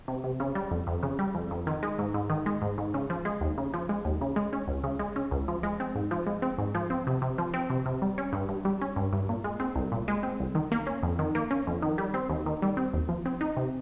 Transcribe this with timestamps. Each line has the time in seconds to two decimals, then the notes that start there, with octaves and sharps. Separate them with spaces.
0.08 C3
0.24 C3
0.40 C#3
0.55 G3
0.71 F2
0.87 F2
1.03 C#3
1.19 G3
1.35 F2
1.51 F2
1.67 D#3
1.83 G#3
1.99 G#2
2.14 G#2
2.30 D#3
2.46 G#3
2.62 G#2
2.78 G#2
2.94 C#3
3.10 F3
3.25 G#3
3.41 D#2
3.58 C#3
3.74 F3
3.89 G#3
4.05 D#2
4.21 C#3
4.36 G#3
4.53 C#4
4.68 C#2
4.84 C#3
4.99 G#3
5.16 C#4
5.31 C#2
5.48 F3
5.63 G#3
5.80 C4
5.95 G#2
6.11 F3
6.27 G#3
6.42 C4
6.58 G#2
6.75 F3
6.90 C4
7.07 C3
7.22 C3
7.38 F3
7.54 C4
7.70 C3
7.86 C3
8.02 G3
8.18 C#4
8.33 G2
8.49 G2
8.65 G3
8.82 C#4
8.96 G2
9.13 G2
9.29 A#2
9.44 G#3
9.60 C4
9.76 C2
9.92 A#2
10.08 G#3
10.23 C4
10.40 C2
10.55 D#3
10.72 A#3
10.87 C#4
11.03 F2
11.19 D#3
11.35 A#3
11.51 C#4
11.67 F2
11.82 D#3
11.98 G3
12.14 C4
12.30 D#2
12.46 D#3
12.62 G3
12.77 C4
12.94 D#2
13.09 F3
13.26 C4
13.41 D#4
13.57 C3